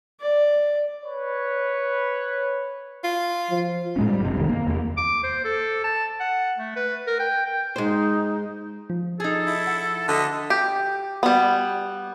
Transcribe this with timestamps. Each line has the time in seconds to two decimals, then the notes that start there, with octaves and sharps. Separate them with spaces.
0.21 D5
1.04 B4 C#5
3.04 F4
3.50 F3
3.96 A2 G#3 C#4
4.09 G3
4.21 G1 F#2 C3
4.36 F1 C2 C3 D#3
4.49 A#3
4.67 E2 A#3
4.97 D6
5.23 C5
5.45 A4
5.84 A5
6.20 F#5
6.57 A3
6.76 B4
7.07 A#4
7.20 G5
7.46 G5
7.76 G#3 D#4 C5
8.90 F3
9.20 D#4 G#4 A4
9.47 E4
9.67 F#5
10.08 D3 D#5 B6
10.50 G4
11.23 G3 B3